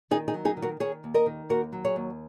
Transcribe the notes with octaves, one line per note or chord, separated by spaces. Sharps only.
D#3 D#4 G#4
D#4 G#4
F#3
D#4 G#4
D#3
F#4 A#4
D#3 G#4 C#5
D#2
A#4 D#5
D#3
D#2 F#4 A#4
F#3
G#4 C#5
D#2